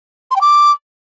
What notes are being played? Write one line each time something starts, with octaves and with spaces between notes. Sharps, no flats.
C6
G5
D6